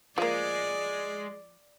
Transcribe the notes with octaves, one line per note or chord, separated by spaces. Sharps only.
F3 G#3 A#3 D5